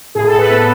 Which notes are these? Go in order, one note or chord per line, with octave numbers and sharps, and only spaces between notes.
A2 G#4
A4
A2
B4
B3 A4